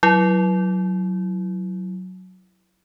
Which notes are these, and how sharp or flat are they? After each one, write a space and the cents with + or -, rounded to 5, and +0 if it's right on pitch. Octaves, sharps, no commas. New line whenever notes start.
F#3 +0 E4 +15